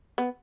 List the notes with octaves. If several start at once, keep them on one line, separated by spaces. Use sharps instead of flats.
B3